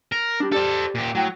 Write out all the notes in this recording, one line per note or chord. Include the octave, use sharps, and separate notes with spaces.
A#4
D4 G4
G4 A4 C5 D5
A#2 G4
A2 F#3 G5